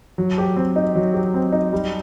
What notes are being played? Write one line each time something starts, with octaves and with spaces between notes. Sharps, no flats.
F#3
G4
C4
D#4
F#3
G4
C4
D#4
G3